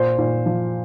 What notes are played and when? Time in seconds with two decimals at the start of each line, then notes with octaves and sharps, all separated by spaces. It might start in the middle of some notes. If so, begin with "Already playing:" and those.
Already playing: A#2 C5
0.18 A#2
0.46 F3